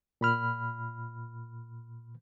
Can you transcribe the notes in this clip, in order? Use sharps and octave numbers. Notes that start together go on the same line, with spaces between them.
A#2 B5 F6